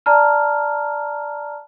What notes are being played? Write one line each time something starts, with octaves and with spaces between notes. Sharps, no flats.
D5 A5 A#5 F6